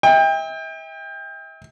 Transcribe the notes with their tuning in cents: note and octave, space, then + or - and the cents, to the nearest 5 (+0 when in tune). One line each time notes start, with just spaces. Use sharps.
E5 -40 G5 +30